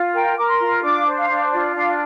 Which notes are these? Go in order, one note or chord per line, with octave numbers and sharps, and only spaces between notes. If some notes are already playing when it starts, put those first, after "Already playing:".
Already playing: F4
A#4 G5
A#4 D6
C6
F4
D4 D6
C5
F5
D4
F4 D5
D4 F5